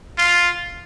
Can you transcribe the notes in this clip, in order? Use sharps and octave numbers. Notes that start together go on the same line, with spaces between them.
F4